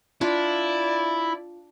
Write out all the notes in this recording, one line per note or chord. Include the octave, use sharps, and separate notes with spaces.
D4 E4 F4 D5